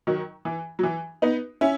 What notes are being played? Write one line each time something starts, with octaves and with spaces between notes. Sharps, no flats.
D#3 F#3
E3
F#3
E3
B3 D#4
C#4 E4